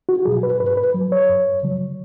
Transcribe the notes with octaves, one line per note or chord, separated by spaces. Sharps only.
F#4
B2 F#3 G#4
B4
G#2 B4
B4
F#3
C#5
F#2
C#3 F#3